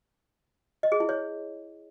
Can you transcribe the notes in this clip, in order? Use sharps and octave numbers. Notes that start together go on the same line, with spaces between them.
D#5
G#4
E4
C#5